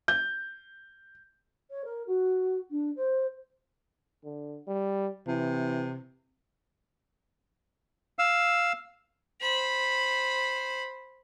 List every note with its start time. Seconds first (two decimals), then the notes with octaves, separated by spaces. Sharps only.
0.08 G6
1.70 C#5
1.84 A#4
2.07 F#4
2.70 D4
2.95 C5
4.24 D3
4.67 G3
5.27 C3 E3
8.19 F5 E6
9.41 C5 B5